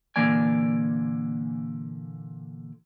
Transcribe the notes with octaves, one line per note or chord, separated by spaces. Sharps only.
A#2 D3 E3 A#3 D5 G#5